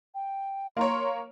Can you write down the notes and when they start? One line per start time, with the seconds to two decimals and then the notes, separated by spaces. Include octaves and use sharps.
0.15 G5
0.77 A#3 A#4 C#5 C6